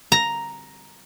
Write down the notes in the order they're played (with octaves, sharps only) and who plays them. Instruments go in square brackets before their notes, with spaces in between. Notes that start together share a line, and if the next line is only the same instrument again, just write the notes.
[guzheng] A#5